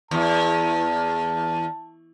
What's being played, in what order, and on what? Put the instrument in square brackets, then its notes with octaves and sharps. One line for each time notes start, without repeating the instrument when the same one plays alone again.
[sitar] E2 [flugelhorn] A5